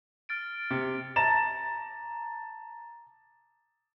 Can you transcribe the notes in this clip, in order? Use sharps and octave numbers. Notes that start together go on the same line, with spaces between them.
F6 A6 D7
C3
A5 A#5 A6 E7